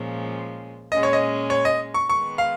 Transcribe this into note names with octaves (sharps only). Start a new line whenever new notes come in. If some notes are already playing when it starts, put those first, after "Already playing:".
Already playing: A#2 F3 G#3 C#4
A#2 G#3 C#4 D#5
C#5
D#5
C#5
D#5
C#6
D#3 G#3 B3 C#6
F5